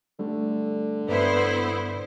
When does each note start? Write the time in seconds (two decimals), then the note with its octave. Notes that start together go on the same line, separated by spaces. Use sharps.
0.19 D3 G3 A3
1.09 G2 B3 E4 B4 C5 D5